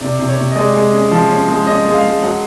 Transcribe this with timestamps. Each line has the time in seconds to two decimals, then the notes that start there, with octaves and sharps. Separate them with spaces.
0.01 C3 D5
0.19 C3
0.29 C#5
0.38 C3
0.52 D#5
0.56 G#3 D5
0.74 G#3
0.93 C#4
1.11 F3
1.29 C#4
1.48 G#3
1.67 C#4 D#5
1.85 G#3
1.94 F5
2.04 G#3
2.22 F#3 F#5